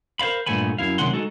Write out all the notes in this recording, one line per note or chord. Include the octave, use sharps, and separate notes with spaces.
A#4 C5 D5 F5 B5
G2 A#2 A3 B3 G#5 B5
F#2 E4 F5
C3 D#3 F#3 G#3 F#5 C6
G#3 D#4 F#4 A4